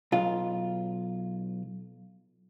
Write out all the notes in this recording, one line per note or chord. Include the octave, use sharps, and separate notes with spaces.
B1 F4